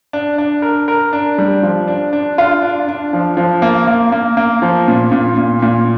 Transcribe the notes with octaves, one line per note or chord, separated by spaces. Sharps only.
D4
D4
A#4
A#4
D4
G3
F3
D4
D4
F4
D4
D4
F3
F3
A#3
A#3
A#3
A#3
F3
A#2
A#2
A#2
A#2